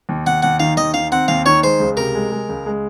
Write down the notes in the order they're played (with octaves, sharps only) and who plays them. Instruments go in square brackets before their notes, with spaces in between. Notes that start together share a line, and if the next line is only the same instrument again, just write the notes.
[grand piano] D#2
[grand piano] D#2 [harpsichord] F#5
[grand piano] D#2 [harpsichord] F#5
[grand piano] D#3 [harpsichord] F5
[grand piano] D#2 [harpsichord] D#5
[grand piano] D#3 [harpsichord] F5
[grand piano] C4 [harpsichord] F#5
[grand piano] D#2 [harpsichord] F5
[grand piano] D#3 [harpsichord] C#5
[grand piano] G#3 [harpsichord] C5
[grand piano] C#2
[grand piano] C3 [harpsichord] A#4
[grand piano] G#3
G#3
C#2
G#3